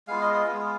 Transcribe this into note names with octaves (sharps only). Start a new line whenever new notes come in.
G#3 B3 F4 F5
D#5
D#5
G#3 B3 F4